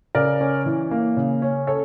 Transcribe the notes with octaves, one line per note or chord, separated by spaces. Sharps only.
C#3 A#4 D5
C#4
E3
A#3
C#3
C#4
A4 C#5